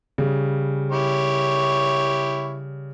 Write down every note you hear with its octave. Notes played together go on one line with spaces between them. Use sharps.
C#3 G3
E4 G4 C#5